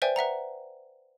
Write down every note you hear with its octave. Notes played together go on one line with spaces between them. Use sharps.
B4 C5 D5 E5 G5 G#5
B4 E5 F#5 A#5